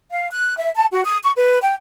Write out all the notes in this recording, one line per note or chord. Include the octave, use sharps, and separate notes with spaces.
F5
F#6
E5
A5
F#4
D#6
C#6
B4
G5